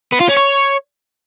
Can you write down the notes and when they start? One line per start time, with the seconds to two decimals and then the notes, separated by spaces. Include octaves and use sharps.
0.12 B3
0.20 F4
0.29 C#4
0.37 C#5